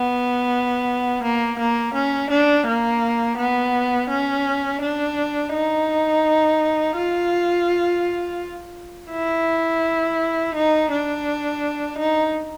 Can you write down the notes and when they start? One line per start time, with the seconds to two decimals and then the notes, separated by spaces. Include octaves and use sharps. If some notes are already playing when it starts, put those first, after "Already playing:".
Already playing: B3
1.23 A#3
1.59 A#3
1.94 C#4
2.30 D4
2.67 A#3
3.37 B3
4.10 C#4
4.81 D4
5.53 D#4
6.97 F4
9.11 E4
10.55 D#4
10.91 D4
11.98 D#4